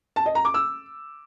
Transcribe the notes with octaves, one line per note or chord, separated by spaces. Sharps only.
A5
D#5
A#5
D6
E6